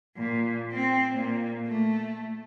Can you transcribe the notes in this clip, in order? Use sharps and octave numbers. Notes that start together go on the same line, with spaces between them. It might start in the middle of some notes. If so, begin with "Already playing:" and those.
A#2
C4
A#2
A3